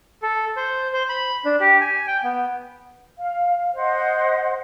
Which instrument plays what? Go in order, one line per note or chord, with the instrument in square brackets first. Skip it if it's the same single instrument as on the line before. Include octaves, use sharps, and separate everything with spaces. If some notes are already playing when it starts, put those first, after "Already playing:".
[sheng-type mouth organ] A4
C5
C5
B5
D4
G4
G#5
G5
B3
[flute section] F5
C5 D#5 F#5